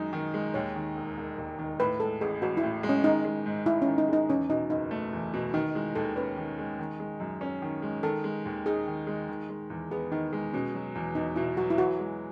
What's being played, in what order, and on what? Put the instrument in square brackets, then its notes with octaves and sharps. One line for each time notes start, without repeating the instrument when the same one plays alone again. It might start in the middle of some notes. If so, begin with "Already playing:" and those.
Already playing: [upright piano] F#2 D#3 G#3 D#4
D#3
G#3
[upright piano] D#2 [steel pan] C#5
[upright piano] D#3
E1
E1
D#2
D#3
[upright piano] A2 [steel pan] B4
[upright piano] G#3 [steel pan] A4
[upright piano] A1 [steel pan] G#4
[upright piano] A1 [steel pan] F#4
[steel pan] E4
[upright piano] A2
G#3
[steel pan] C#4
[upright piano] D#3 [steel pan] D#4
[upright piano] G#3
G#2
[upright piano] G#2 [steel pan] E4
[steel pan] C#4
[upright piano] D#3
[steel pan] D#4
[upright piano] G#3 [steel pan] D#4
[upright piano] E2 [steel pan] C#4
[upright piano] B2 [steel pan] D#4
[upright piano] F#1 [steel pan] D#4
[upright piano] A3
E2
B2
[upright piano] D#3 [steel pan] D#4
[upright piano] G#3 [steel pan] E4
[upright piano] D#2 [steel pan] A4
[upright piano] C#4 [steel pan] B4
[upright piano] D#3
G#3
D#3
G#3
F#2
C#4
D#3
G#3
[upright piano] D#3 [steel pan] A4
[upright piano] G#3
D#2
[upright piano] D#4 [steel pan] G#4
[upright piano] D#3
G#3
D#3
G#3
E2
[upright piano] B3 [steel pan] G#4
[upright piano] D#3 [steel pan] D#4
[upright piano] G#3
[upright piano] B2 [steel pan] C#4
[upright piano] F#3
E2
[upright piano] E2 [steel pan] D#4
[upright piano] B2 [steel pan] E4
[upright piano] F#3 [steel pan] F#4
[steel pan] E4
[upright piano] E3 [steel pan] F#4
[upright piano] G#3